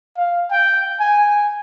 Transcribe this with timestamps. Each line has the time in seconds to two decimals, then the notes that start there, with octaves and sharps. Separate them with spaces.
0.17 F5
0.52 G5
1.00 G#5